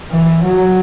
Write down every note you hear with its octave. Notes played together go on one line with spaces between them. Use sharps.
E3
F#3